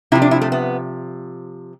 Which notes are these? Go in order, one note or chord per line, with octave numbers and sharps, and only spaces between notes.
C3 F3 E4
D4
E4
A3
B3